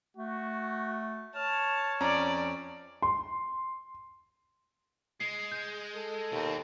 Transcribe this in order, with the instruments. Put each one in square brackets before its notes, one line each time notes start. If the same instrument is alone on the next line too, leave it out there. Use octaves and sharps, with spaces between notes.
[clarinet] A3 [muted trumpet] F#4
[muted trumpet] C#5 [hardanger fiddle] A5 [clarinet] F6
[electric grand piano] F2 C#4 A#5 [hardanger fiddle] D5
[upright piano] C6
[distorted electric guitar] G#3 [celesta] C7
[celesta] G6
[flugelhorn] A4
[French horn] D#2 [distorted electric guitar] B2 C4